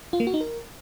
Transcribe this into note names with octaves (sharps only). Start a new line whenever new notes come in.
F4
A#3
F#4
D#4
A#4